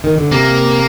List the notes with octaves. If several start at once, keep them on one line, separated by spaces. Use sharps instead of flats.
D#3
D3
C3 A#3